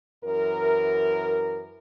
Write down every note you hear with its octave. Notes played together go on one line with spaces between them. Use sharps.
F#2 E3 A#4